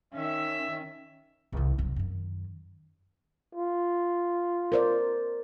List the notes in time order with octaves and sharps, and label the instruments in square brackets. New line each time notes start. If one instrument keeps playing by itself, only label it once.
[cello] D#3 C#4 [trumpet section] E5
[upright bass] C2 D#3
C2 F#2
F#2 D#3
[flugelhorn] F4
[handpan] A#4 C5 D5